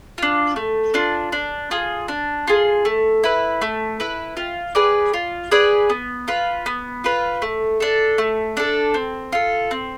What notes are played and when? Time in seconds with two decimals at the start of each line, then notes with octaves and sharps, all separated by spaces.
0.18 D4 F4
0.56 A3
0.94 D4 F4
1.32 D4
1.71 F4 G#4
2.08 D4
2.47 F4 G#4
2.85 A3
3.24 E4 B4
3.62 A3
4.00 E4 B4
4.37 F4
4.75 G#4 B4 D5
5.14 F4
5.51 G#4 B4 D5
5.90 B3
6.28 F4 B4
6.66 B3
7.04 F4 B4
7.42 A3
7.80 D4 A4
8.18 A3
8.57 D4 A4
8.94 C4
9.32 F4 A4
9.71 C4